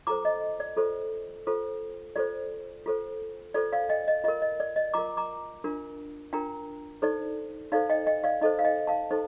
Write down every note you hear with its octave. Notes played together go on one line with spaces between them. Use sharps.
F4 A4 C5 A#5 D6
D#5
D5
F4 A4 C5
F4 A4 C5
F4 A4 C5 D5
F4 A4 C5
F4 A4 C5 D5
D5 F5
D#5 G5
D#5
F4 A#4 D#5
D#5
D5
D#5
F4 A#4 A#5 D6
A#5 D6
D4 F4 A#4
D4 F4 A#4 G5 A#5
D#4 A4 C5 D5
D#4 A4 C5 D5 F5
D#5 G5
D#5 G5
D5 F5
D#4 A4 C5 D#5
F5
D#5 G5
F5 A5
D#4 A4 C5